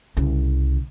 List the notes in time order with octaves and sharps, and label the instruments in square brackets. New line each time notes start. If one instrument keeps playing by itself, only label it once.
[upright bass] C2 C#3